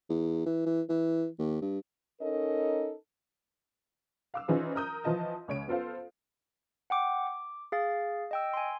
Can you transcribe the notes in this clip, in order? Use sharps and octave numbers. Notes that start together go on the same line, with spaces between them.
E2
E3
E3
E3
D#2
G2
C#4 D#4 A4 A#4 D#5
F5 D6 E6
E3 C#4 D#4 F4 G#4 C5
A#4 A#5 D#6 G6
E3 F3 F4 D#5 A5
C#2 C#5 D7
B3 F4 A4 C5 F5
F#5 G5 D6
D6
G#4 F5 A6
D#5 G5 E6
G#5 C6